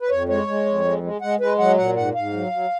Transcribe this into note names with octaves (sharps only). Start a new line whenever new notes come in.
B4
F2 C#5
G#3 C#5
G#3
F2
G#3
G#3
G#3 F#5
G#3 B4
F#3 F#5
A#2 F#5
G#2 F#5
G#2 F5
F#3
F#3